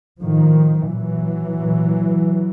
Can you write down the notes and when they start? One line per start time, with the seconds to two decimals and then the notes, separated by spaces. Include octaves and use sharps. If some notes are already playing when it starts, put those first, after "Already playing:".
0.21 A2 D#3 F3
0.89 A#2 E3 F#3
1.58 A#2